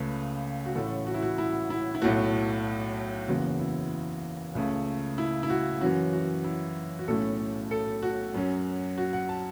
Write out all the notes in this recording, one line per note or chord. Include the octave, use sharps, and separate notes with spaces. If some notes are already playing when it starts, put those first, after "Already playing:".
Already playing: C#2 C#3 A3 C#4 B4
F#4
A1 A2 A3 C#4 A4
F#4
E4
F#4
E4
E4
E4
B1 A2 A3 F#4
F#1 E2 C#3 F#4
E4
C#2 C#3 A3
E4
E4
F#4
F#2 E3 C#4 F#4
F#4
E4
F#4
B1 A2 A3 C#4 A4
A4
F#4
F#2 F#3 C#4
F#4
F#5
A5